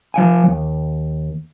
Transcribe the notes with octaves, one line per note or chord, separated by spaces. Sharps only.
F3 F5 G#5
D#2